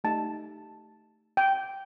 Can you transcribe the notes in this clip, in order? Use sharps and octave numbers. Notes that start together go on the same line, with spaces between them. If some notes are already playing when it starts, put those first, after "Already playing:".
A3 D#4 G4 A5
G5